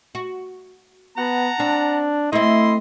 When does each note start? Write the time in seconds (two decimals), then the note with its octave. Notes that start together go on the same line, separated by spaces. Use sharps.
0.15 F#4
1.18 B3 F#5 A5 A#5
1.60 C4 D4
2.33 A3 C4 E4 D#5 C6